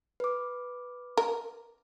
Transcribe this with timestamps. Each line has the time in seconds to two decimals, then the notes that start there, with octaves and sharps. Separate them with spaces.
0.20 B4 D6
1.17 A#4